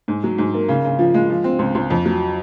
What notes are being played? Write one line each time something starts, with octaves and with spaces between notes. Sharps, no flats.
G#2
F#3
G#2
A#3
C#3
C#3
F3
G#3
F3
C4
C#2
C#2
F2
F#3